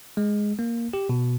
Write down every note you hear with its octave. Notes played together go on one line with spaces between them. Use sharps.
G#3
A#3
G4
B2